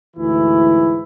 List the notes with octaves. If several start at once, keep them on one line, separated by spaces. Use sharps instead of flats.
D2 G#2 E3 E4